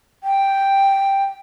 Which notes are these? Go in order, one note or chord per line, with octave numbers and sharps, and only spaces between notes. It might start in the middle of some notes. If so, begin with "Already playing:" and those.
G5